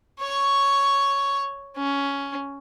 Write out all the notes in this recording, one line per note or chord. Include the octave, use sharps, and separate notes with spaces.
C#5 C#6
C#4